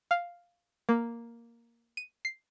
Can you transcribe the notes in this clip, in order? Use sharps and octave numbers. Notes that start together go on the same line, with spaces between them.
F5
A#3
D#7
C7